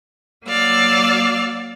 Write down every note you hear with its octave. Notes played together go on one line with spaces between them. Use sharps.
F#3 A#3 D5 F5 E6